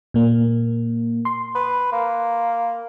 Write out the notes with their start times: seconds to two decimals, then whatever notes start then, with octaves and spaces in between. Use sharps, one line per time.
0.14 A#2 A#3
1.25 C6
1.55 B4
1.92 A#3